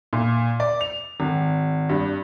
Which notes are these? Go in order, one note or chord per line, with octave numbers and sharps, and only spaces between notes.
A#2
D5
F7
G#1
G2